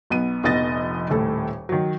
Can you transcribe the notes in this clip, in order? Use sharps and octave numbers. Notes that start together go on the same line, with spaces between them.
B1 B3 D#7
F1 A#1 B3 D#5 A6 A#6
D#1 A2 A4
D#3 F#3